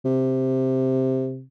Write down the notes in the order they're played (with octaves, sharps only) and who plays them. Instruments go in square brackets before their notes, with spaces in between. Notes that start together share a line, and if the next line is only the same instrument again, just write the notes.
[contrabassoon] C3